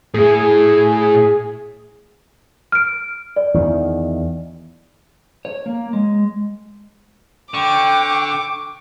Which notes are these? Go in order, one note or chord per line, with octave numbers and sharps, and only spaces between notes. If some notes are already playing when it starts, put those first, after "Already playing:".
A2 E4 G#4
F6 D7
D5
E2 D#3
C#5
A#3
G#3
D3 G5 C#6 D6